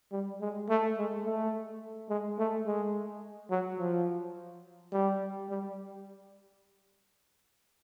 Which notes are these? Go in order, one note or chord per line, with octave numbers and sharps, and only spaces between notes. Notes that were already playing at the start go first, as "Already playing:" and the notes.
G3
G#3
A3
G#3
A3
G#3
A3
G#3
F#3
F3
G3
G3